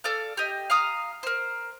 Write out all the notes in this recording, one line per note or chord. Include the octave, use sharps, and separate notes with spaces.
A4 D5 F5
G4 D#5
F5 A#5 D#6 F6
A#4 C5